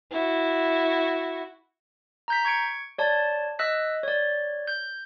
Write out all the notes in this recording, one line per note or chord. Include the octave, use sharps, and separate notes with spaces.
E4 F#4
A#5 G6 B6
C#6 G#6 C#7 D7
C#5 D5 A5
D#5 E6 F#6 B6
C#5 D5
G6